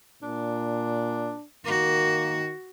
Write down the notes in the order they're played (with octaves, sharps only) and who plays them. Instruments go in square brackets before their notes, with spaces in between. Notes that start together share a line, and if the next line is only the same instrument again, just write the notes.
[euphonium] A#2 [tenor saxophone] D4
[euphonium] D#3 [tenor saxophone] A#3 [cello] F#4